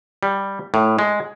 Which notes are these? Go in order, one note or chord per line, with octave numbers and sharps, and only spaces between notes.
G3
A2
G#3